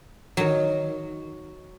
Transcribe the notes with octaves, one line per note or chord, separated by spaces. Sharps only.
D#3 F#3